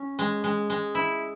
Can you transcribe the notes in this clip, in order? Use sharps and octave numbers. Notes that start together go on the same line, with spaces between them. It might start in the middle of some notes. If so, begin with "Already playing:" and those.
Already playing: C#4
G#3
G#3
G#3
E4